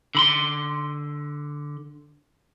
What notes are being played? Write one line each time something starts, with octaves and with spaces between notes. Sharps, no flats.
D3 B5 C6